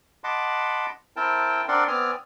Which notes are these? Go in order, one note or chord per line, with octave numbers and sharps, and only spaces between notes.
D#5 F#5 A5 B5 C6 D6
C4 E4 A#4 G5 A5
C4 D4 A#4 D5 F#5 C6
B3 C4 D5 G#5 D#6 F6